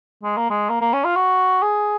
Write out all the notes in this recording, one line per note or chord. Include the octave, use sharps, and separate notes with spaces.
G#3
A#3
G#3
A#3
A#3
C#4
F4
F#4
G#4